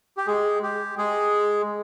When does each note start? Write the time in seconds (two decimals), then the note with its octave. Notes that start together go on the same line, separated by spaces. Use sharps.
0.17 G4
0.27 G#3 G#4
0.63 G4
0.98 G#3 G#4